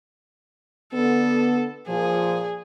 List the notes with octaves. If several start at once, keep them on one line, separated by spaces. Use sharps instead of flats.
D3 B3 A4
A#2 F3 G#4